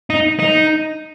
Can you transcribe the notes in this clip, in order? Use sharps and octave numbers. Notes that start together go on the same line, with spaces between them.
D#4
D#4